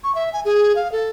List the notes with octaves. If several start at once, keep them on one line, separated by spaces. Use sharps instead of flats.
C#6
E5
G#5
G#4
F5
A4